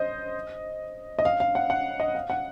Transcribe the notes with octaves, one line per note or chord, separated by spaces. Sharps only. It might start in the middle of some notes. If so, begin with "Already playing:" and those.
Already playing: C5 D#5
D#5
F5
F5
F#5
F#5
D#5
F5
F#5